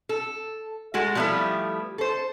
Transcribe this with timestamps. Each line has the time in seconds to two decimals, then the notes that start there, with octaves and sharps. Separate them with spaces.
0.09 A4
0.94 G#3 A3 F#4
1.15 F3 G3 A3 B3 E4 G4
1.98 A4 C5